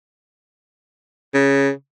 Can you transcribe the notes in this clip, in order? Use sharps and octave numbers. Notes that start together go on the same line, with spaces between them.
C#3